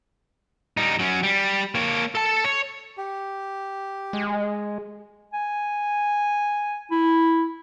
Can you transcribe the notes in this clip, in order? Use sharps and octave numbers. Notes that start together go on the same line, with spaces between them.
G3 D#4
F#3 C#4
G3
A#3 C#5
A4 A5
C#5
G4
G#3
G#5
E4